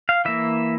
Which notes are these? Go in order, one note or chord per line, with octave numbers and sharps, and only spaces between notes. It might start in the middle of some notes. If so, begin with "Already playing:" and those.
F5
E3 A#3 E5